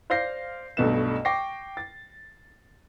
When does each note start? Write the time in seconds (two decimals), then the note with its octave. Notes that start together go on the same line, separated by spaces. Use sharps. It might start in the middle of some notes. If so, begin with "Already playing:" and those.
0.10 C5 D5 F5 G6 A#6 C7
0.77 B1 G2 B2 A3 B4 E7
1.25 G5 C#6 D6 A#6 C7
1.77 A6